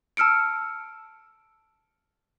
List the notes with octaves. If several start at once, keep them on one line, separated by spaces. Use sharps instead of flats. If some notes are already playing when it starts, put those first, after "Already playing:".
A5 E6 F6 C#7 D7